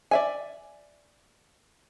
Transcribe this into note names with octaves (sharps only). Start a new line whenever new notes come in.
D5 E5 G#5